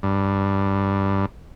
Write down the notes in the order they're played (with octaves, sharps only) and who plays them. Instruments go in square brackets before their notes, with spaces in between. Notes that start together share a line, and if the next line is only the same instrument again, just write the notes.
[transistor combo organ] G2